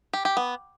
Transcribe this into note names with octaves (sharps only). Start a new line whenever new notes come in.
G4
G4
B3